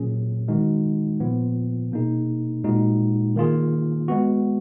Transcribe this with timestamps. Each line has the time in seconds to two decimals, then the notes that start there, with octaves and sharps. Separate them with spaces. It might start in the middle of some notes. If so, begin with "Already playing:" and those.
Already playing: A#2 F#3 C#4 G#4
0.48 D#3 G#3 D#4 F#4
1.20 A#2 F3 B3 F4
1.92 B2 A#3 D#4 G#4
2.64 A#2 G#3 D#4 F#4
3.36 D#3 A#3 F4 G#4
4.08 G#3 B3 F#4